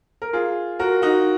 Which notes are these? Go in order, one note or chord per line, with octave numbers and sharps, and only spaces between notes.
A#4
F4 G#4
F#4 A#4
D#4 F#4